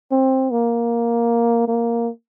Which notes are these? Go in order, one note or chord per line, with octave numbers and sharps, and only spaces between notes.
C4
A#3
A#3